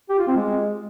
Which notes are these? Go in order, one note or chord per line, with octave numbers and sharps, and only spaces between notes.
G4
F4
C4
G#3